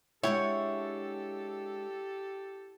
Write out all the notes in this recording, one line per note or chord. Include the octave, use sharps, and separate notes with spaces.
G#3 D4 E4 G4 A4 C#5 F#5 G5